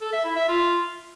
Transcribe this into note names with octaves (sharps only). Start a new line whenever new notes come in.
A4
E5
E4
E5
F4